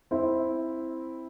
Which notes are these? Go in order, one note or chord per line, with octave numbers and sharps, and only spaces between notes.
C4 E4